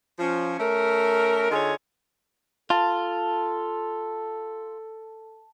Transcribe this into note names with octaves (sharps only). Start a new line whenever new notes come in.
F3 C#4
A3 C#4 A#4
D3 D#4 F4 G#4 C#5
F4 A4 A5